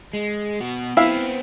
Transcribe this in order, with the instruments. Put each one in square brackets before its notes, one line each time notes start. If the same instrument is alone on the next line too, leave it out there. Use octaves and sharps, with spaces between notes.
[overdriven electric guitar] G#3
B2 F#4
[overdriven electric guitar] B3 C4 [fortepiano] E4 E5 F5